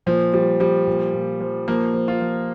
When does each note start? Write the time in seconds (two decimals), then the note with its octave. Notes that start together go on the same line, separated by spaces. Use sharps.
0.06 A#2 F3
0.33 F3 G3
0.60 F3 G3
0.87 A#2
1.14 A#2
1.41 F3
1.68 F3 A#3
1.94 F3
2.08 F4
2.21 F3